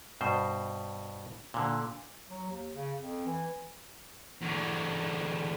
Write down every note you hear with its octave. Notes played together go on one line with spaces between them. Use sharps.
G2 B2 C5
A#2 D3
F#3
D#2
C#3
F2
E3
E2 D3